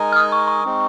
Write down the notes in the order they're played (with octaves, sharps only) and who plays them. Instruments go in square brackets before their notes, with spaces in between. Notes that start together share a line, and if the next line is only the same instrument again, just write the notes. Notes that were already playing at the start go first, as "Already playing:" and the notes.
Already playing: [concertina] G#3 D#4 A#4 D#5 G#5
[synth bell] F6
D#6
C#6
C#6
[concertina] G#3 C4 D#4